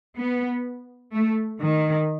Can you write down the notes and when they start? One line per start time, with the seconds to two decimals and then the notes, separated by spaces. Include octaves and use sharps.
0.16 B3
1.13 A3
1.61 D#3